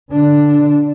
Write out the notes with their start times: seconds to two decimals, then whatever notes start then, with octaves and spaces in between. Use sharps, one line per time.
0.11 D3 D4